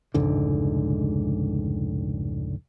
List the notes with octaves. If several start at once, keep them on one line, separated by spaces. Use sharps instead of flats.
F1 C#2 G#2 D3